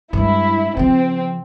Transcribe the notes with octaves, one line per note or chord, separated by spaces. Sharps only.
G2 G#3 E4
C#3 F3 C4